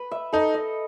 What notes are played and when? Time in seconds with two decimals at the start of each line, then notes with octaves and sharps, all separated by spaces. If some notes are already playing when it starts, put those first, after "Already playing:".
Already playing: B4
0.11 E5
0.33 D#4 A4
0.54 D#5